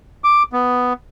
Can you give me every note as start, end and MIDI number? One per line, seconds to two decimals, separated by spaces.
0.24 0.43 86
0.53 0.93 59